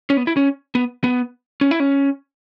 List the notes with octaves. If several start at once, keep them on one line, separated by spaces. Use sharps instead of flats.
C#4
B3
E4
C#4
B3
B3
C#4
E4
C#4